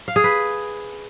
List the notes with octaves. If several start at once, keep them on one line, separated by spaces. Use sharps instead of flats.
F5
G#4
B4